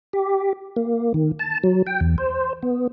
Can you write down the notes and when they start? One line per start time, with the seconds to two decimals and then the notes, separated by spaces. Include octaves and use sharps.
0.13 G4
0.76 A#3
1.14 D#3
1.39 A5
1.64 F#3
1.87 G5
2.01 E2
2.18 C5
2.63 B3